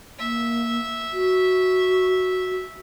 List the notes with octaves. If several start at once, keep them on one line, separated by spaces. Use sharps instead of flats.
A#3 E5
F#4